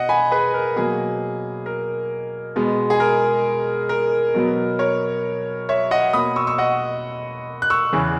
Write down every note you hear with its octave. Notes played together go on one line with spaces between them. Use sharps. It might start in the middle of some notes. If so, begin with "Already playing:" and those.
Already playing: B2 D#5 F#5
G#5 B5
G#4 B4
A#4
B2 F#3 A#3 G#4
A#4
B2 G#3 B3
G#4
A#4
A#4
B2 F#3 B3
A#4 C#5
C#5 E5
D#5 F#5
B2 A#3 B5 D#6
C#6 E6
C#6 E6
D#5 F#5
F#6
C#6 E6
E2 C#3 E3